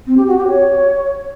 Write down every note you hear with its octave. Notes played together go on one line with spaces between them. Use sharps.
C4
G4
F#4
G4
C#5